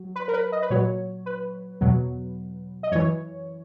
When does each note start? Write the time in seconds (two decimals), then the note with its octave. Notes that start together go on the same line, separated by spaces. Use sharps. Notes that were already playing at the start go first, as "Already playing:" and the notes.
Already playing: F#3
0.16 B4
0.28 A#4
0.33 B4
0.52 D#5
0.62 B4
0.70 A#2 F#3 C#5
1.26 B4
1.81 E2 B2 F#3
2.83 D#5
2.91 F#2 E3 C#5